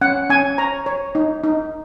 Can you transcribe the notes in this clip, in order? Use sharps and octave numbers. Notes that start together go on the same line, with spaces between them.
C#4 F#5
C#4 G#5
C#5 A#5
C#5
D#4
D#4